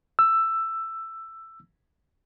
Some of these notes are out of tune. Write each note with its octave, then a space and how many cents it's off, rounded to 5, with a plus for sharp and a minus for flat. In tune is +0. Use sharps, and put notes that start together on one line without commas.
E6 +10